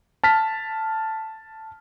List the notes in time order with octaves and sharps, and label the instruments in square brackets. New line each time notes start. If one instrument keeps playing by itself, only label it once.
[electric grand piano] A5 F6 B6